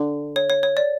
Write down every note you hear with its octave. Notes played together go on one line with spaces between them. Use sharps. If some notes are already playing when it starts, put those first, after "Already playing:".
Already playing: D3
C#5
C#5
C#5
D5